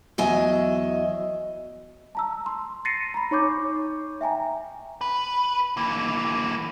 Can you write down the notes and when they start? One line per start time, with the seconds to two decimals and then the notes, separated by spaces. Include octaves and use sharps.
0.18 E2 F#3 D#5 E5 G#5
2.15 A5 A#5 E6
2.46 C6
2.85 A6 A#6 C7 C#7 D#7
3.14 A#5 B5
3.31 D#4 C#5 C#6 D6 G6
4.21 E5 G5 G#5 A#5
5.01 B4
5.77 E3 A#3